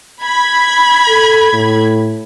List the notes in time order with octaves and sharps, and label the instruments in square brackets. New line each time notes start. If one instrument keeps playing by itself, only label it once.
[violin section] B5 G#6
[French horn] A4
A2